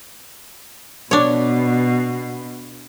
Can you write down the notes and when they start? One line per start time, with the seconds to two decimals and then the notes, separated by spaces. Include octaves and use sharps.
1.11 B2 D4 C#5